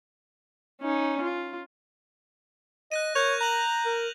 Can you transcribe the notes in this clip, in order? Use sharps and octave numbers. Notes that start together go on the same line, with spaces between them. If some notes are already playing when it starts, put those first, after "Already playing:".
C#4 D#4
F4
D#5 F#6 A#6 D#7
A#4 C#5 F#6 G6 F7
A#5 F#6 F#7
A#4